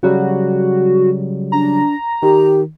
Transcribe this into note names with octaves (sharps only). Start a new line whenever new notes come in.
C#3 F#3 G3 F#4
D4 A#5
D#3 G4